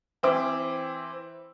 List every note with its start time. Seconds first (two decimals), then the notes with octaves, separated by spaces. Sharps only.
0.23 E3 C4 E4 D6